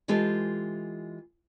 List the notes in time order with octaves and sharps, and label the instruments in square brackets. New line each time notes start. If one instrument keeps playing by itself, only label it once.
[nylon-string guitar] E3 G#3 F4 G4 A4